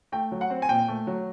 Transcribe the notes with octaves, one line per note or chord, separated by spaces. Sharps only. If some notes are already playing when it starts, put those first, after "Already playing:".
A3 G5
F#3
F#5
C4
G#5
A#2 G5
A3
F#3